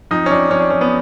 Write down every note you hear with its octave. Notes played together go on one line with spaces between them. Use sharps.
F2 D#4
C#4
F2 D4
F2 C#4
D4
F2 C#4
B3